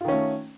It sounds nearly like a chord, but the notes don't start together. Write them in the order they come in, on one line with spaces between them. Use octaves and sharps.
F4 D#3 C#4 A3